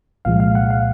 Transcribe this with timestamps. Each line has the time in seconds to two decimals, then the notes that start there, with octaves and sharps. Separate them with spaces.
0.25 C2 A#2 F3 G#3 F5
0.40 F5
0.55 F#5
0.70 F5